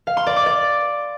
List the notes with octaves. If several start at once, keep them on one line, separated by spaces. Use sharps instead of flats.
F5
C6
D5
D6
D5